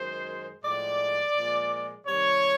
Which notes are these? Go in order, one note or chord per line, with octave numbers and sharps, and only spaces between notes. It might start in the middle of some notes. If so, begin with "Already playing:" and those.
Already playing: F#2 D#3 G#3 C5
A2 F3 G#3 D5
A#2 F3 G#3
C3 D#3 G3 C#5